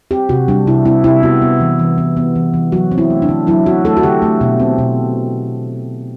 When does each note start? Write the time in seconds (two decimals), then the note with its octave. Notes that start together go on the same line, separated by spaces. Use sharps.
0.11 C4 G4
0.29 C3 F#4
0.48 G3 D4
0.67 C3 E4
0.85 C4 E4
1.04 C3 E4
1.23 B3 F#4
1.42 B3
1.60 E3
1.79 E3
1.98 B3
2.17 B3
2.36 E3
2.54 E3
2.72 F#3 F#4
2.91 C4
2.98 E4
3.10 A3
3.22 D4
3.29 D3
3.47 F#3 E4
3.66 C4 F#4
3.85 A3 A4
3.97 F#4
4.03 D3 G4
4.22 A3
4.41 B2
4.60 C4
4.78 B2